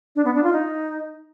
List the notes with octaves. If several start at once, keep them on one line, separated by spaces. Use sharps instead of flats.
D4
B3
D4
F4
D#4